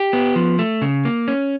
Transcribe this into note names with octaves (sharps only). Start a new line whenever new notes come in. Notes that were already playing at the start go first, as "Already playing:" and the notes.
Already playing: G4
B3
F3
A3
C#3
A#3
C#4